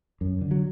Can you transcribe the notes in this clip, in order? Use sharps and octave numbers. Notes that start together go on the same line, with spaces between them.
F#2
D3
F#3